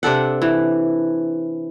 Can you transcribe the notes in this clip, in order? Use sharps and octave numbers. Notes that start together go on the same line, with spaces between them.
C3 D4 A4 F#5
E3